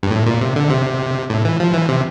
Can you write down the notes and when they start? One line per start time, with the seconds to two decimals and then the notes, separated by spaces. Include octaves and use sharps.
0.03 G2
0.11 A2
0.26 A#2
0.41 C3
0.56 D3
0.70 C3
1.30 A2
1.45 E3
1.60 F3
1.74 E3
1.89 C3